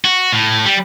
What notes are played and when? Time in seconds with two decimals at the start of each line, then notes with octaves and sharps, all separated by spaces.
0.05 F#4
0.32 A2
0.65 G3